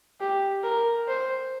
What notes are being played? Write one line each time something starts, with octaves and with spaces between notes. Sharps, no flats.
G4
A#4
C5